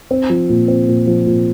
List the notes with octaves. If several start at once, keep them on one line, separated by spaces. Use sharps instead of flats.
C4
F3
A#2
C4
A#2
F3
A#2